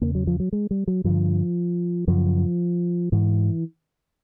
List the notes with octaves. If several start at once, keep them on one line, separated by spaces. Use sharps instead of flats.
E2 C#3 A#3
F#3
F3
F#3
G#3
G3
F#3
G2 D3 F3
F#2 C#3 F3
G#2 E3